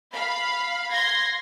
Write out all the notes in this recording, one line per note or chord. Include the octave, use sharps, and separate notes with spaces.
F5 B5
C6 G#6 A#6